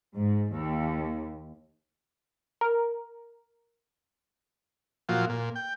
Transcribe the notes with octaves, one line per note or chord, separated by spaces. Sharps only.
G#2
D#2
A#4
A#2 F3 F#3 F4
A#2
G5